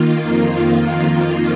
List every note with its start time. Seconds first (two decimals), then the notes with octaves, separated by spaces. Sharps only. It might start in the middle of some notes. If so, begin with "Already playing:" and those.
Already playing: D#3 A#3 F4
0.24 F2 D#3 A#3 F4